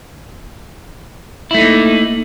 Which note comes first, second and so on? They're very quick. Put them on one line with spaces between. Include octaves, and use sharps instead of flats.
E4 A3 D#4 A#3